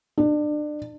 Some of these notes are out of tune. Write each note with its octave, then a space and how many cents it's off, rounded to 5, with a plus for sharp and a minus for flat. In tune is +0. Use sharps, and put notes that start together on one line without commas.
D4 +30